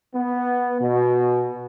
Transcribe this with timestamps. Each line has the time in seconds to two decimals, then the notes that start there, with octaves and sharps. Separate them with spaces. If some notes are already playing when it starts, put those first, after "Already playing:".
0.15 B3
0.81 B2